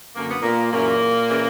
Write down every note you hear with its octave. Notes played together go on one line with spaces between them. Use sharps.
F#2 D3 A#3
B3
A#2 A#3
F#2 A#2 C#3 E3 A#3
C#3 E3